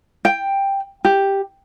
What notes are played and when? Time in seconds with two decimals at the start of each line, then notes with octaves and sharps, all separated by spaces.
0.25 G5
1.05 G4